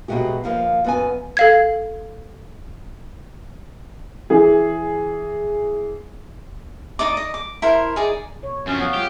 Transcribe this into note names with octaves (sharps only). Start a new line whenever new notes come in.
B2 F#3 G#3 A3 G4
D#2 F3 A#3
F#2 B3 G#5
A4 F5 G#6
E3 G#4
D#4 D5 D#5 D6
D#5
D6
E4 A#4 C5
D#4 G#4 D5
B2 C#5
F#2 F3 C#4
B3 C#5 F5
G#3 F4 G4